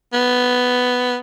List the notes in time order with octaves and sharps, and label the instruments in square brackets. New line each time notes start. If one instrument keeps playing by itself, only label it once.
[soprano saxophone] B3